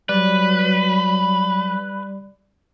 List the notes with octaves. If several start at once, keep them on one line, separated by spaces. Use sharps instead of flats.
F#3 G3 B4 D5